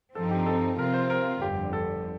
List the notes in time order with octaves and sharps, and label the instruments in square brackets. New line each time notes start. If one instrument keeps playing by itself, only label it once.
[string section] G2 F3 C4 D#4 [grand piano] A4
[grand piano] G4
A4
[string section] C3 F3 C4 F4 [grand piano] A#4
[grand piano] C5
A#4
[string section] G1 F2 D3 [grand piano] G4
[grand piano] A4